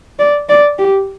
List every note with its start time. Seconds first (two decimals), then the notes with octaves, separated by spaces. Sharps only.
0.19 D5
0.49 D5
0.79 G4